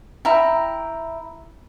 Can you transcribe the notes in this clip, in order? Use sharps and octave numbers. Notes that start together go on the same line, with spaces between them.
E4 G5 A#5